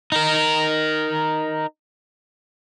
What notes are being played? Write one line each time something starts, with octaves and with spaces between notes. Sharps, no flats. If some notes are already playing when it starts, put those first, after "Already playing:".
D#4 A#4